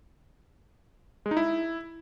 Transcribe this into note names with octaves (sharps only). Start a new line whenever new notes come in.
G#3
D#4
E4